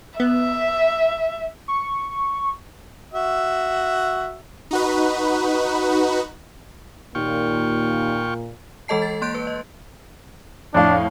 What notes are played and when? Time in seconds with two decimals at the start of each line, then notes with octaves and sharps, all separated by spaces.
0.20 B3 E5
1.68 C#6
3.13 F#4 E5
4.71 D#4 F#4 B4
7.15 D#2 A#2 F4 G5 C#6
8.88 E3 G#3 A4 D#5 A5 C7
9.02 A6
9.22 A#3 C6 F#6 G6 D7
9.35 B4
9.47 D#5
10.75 F2 A2 D4 F5